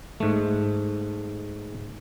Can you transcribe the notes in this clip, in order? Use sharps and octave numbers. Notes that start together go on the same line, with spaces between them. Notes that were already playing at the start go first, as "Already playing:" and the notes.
G#2 A3